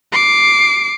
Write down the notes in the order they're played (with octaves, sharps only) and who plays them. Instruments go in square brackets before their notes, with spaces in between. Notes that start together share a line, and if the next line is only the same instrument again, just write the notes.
[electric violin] D6 C7